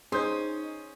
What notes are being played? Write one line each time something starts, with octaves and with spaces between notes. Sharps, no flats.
C#4 D#4 G#4 C5 C6 D#6 G6